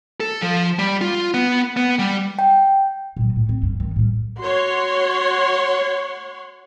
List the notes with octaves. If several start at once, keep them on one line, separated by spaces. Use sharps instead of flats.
A4
F3
G3
F4
B3
B3
G3
G5
A#2 F#3
A2
C4
G2
D#3
A2 G3
F#4 C#5 F#5 C6